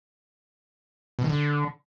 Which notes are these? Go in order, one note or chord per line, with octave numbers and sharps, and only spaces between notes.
B2
D#3
D3